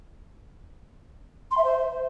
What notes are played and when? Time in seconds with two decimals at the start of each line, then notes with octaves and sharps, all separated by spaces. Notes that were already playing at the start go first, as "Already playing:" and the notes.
1.51 C6
1.58 E5
1.64 C5